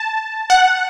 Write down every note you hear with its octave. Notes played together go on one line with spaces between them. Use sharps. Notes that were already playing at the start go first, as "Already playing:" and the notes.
Already playing: A5
F#5